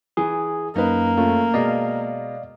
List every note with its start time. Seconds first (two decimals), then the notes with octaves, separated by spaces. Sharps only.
0.17 E3 G#4
0.76 F#2 A#3 D#4 B4
1.17 A3 C#4 F4
1.54 B2 G#3 D5 D#5 F5